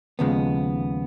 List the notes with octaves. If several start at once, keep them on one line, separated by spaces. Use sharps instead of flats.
D#2 C#3 F3 G#3 B3